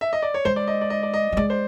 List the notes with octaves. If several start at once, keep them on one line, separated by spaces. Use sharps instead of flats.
E5
D#5
D5
C#5
G#3 C5
D5
D#5
D5
D#5
D5
D#5
G3
G#3 D5
C5